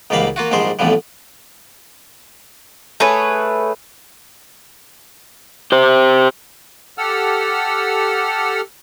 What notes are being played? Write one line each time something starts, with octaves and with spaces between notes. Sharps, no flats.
C#2 G#2 G3 A#3 F5 B5
A#3 F4 F#4
A#1 G#2 G3 G#3 C5 C6
B1 F2 A2 D3 F3 G3
A3 G#4 B4 C#5
G4 C5
G4 A4 F#5 E6 F6